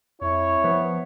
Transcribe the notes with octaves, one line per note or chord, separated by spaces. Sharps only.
F2 E4 C#5
F3 B3